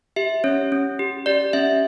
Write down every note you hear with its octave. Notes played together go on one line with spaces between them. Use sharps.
G4 E5
C#4 C#5
C#4
G4
G4 D5
C#4 E5